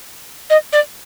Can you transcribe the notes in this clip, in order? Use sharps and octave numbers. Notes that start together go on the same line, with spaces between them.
D#5
D5